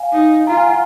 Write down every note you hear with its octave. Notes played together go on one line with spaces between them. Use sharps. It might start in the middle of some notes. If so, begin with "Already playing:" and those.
Already playing: F5 G#5
D#4
F4 A#5
G#5
F#5